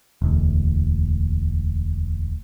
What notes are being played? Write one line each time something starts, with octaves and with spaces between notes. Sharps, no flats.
E1 D2